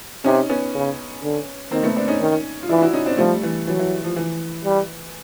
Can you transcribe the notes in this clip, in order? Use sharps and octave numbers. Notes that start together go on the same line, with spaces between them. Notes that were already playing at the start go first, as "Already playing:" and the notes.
C3 C#4 D#4
B3 C#4
C#3
D3
D#3 A#3 C4
A3 B3
C4 D4
C#4 D#4
D#3
F4
E3 D4 E4
E4 F#4
C#4 D#4
C4 D4
F3 G3 A3
E3
E3 F#3
E3
F3
E3
G3